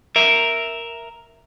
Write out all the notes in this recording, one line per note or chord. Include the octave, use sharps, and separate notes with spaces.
A#4 E5